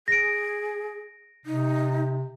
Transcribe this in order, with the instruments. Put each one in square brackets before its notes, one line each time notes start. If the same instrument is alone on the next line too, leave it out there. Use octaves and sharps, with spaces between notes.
[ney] G#4 [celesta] A#6 D7
[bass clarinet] C3 [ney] D#4